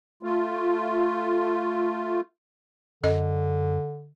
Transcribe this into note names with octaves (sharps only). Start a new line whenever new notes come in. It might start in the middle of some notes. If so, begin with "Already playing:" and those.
A3 F4
F#2 D3 A4 D#5